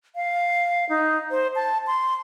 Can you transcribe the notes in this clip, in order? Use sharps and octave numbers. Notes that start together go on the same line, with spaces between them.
F5
D#4
C5
A5
C6